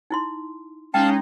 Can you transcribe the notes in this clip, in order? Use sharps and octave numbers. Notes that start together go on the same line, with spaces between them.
D#4 E4 C6
G#3 C#4 D#4 F5 G5 A5